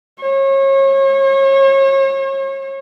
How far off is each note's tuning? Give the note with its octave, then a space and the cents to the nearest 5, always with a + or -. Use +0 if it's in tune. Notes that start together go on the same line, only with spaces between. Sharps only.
C#5 -35